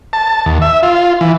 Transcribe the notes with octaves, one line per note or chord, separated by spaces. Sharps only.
A5
D#2
E5
F4
E3